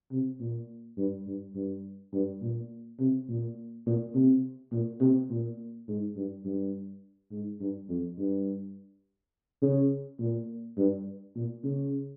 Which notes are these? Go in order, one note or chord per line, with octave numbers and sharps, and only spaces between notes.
C3
A#2
G2
G2
G2
G2
A#2
C3
A#2
A#2
C3
A#2
C3
A#2
G#2
G2
G2
G#2
G2
F2
G2
C#3
A#2
G2
A#2
C#3